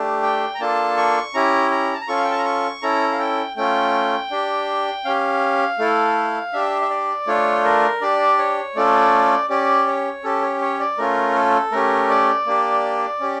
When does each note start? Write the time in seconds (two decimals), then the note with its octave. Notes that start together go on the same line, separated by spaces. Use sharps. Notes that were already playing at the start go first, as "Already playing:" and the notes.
Already playing: A3 D4 G4
0.23 G5
0.55 A#5
0.60 A#3 D4 F4 A4 A5
0.97 C#6
1.34 C#4 E4 G4 A#5
1.71 A#5
1.94 A5
2.01 A#5
2.08 C#4 F4 A4 C#6
2.17 F5
2.24 G5
2.31 A5
2.38 A#5
2.45 C#6
2.82 C#4 E4 A4 A#5
3.12 F5
3.19 G5
3.56 A3 C#4 F4 G5
4.31 D4 G4
5.05 C#4 G4 F5
5.79 A3 E4 A4
6.53 D4 G4 E5
6.82 E5
6.90 D5
7.27 A3 D4 F4 C#5
7.64 A#4
8.01 D4 G4 D5
8.38 C#5
8.75 A3 C#4 F4 A4 D5
9.50 C#4 G4 D5
9.87 C#5
10.24 C#4 G4 A4
10.42 C#5
10.61 C#5
10.80 D5
10.98 A3 C#4 F4 A#4
11.35 A4
11.72 A3 C#4 G4 A#4
12.09 D5
12.46 A#3 D4 G4
13.20 C#4 G4